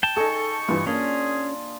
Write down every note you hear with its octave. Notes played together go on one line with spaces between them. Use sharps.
G5 A5
D#4 G#4 A4 C#6
G2 E3 F4
A#3 C#4 D4 G#4